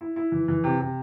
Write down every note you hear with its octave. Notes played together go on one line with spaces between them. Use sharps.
E4
E4
E3
E3
C3
C3